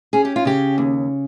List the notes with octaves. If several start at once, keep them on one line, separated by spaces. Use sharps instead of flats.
C#4 G#4
G4
F4
C#3 G4
D#2